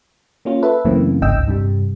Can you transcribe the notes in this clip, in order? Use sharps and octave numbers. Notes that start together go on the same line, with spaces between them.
A#3 C#4 F4
A4 B4 E5
F#2 C#3 E3 A3 A#3 C4
G1 C#2 G#2 D#5 G5 E6
G2 C3 G3